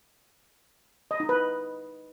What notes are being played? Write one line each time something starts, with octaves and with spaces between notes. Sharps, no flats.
D#5
D#4
B4